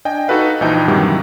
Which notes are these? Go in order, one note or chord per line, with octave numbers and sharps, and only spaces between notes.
D4 D#5 G5 G#5
D#4 F#4 A4 B4 F5
A#1 E3 F3 D#4 G5
G2 C3 D#3 E3 F#3 G3